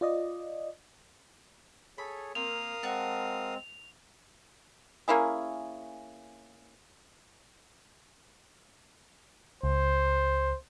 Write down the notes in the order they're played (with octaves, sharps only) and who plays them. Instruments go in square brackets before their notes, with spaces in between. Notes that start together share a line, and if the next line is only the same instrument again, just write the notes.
[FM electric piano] F4 D5 D#5
[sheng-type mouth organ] G#4 C#5 [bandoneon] A4 [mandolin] B5
[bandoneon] A#3 [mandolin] C4 [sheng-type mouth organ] A#4 F5 D#6 [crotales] F7
[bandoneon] G#3 C4 [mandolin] F#4 A5
[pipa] A#3 C#4 E4 G#4
[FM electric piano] C#2 [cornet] C5